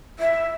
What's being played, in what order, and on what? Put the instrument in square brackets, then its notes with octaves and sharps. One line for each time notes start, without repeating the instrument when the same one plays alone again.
[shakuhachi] E5